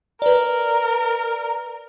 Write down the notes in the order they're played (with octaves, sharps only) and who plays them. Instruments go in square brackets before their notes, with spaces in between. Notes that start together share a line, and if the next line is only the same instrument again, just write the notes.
[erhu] A#4 [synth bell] B4 D5